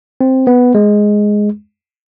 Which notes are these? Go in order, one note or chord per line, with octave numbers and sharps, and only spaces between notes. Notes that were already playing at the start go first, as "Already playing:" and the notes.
C4
B3
G#3